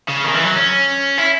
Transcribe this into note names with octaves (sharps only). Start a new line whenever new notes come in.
C#3
D#3
E3
F#3
C#4
E4